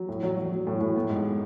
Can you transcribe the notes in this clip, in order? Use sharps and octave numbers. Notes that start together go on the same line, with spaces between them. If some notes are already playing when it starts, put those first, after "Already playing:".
Already playing: F#3
A2
F#3
F#3
F#3
A2
A2
B3
G#2